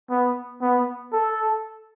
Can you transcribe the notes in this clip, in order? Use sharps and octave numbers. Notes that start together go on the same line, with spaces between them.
B3
B3
A4